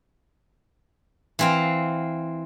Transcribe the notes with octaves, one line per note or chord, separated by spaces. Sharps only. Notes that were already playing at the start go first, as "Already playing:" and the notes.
E3 C4 F5